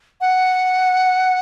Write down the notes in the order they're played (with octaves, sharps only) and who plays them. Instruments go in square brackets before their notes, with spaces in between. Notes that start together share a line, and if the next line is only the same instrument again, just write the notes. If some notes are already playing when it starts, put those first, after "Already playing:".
[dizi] F#5